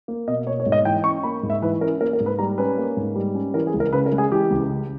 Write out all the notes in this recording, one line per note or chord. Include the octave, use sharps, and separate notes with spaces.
A#3
B2 D#5
A#3 C#5
C#5
G#2
D#5
E3 G5
C#4 C#6
A#3 B5
G#2
E5
E3 B4
C#4 A#4
A#3 A#4
A#4
G#2
B4
G3 A#5
C#4 B4
A#3
G#2
G3
C#4
E3 A#4
G#4
C#2
A#4
C#3 B4
A#4
G#3
G#4
E3 G4
C#2
C#3